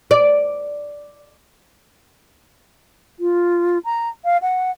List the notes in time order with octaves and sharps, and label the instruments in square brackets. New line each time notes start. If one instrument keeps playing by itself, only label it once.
[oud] D5
[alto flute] F4
A#5
F5
F#5